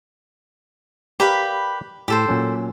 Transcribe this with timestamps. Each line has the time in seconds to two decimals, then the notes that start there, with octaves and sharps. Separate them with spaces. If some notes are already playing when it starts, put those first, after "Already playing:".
1.20 G4 A#4 B4 D5 F5 B5
2.08 A2 G4 A4 C5
2.28 A#2 F#3 C#4